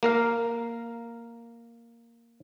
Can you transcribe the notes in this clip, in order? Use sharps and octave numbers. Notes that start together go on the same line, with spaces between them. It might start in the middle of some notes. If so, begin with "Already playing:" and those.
A#3 A#4 F5